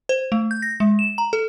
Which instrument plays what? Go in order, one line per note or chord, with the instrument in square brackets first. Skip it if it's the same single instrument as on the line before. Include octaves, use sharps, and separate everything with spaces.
[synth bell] C5
A3
G6
A#6
G#3
E7
A#5
A4